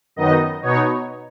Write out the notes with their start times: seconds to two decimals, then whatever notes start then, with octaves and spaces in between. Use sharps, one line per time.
0.16 F#2 D#3 B3 D#4 D#5
0.62 B2 B3 D#4 C#5